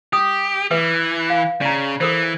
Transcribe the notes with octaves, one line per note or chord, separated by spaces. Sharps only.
G4 D#6
E3 B4 E5 D6
F5
C#3 D5 A#5
E3 A4 A#4 C5